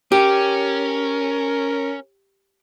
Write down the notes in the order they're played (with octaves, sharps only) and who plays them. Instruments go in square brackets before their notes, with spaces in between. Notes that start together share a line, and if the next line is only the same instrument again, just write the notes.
[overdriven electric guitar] C#4 [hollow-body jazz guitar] G4 [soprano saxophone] A#4